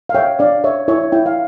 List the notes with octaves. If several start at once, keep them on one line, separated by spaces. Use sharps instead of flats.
F5
C#5 E5 G5
D4 D5 F5
C#5 E5
E4 C#5 E5
E4 G5
F5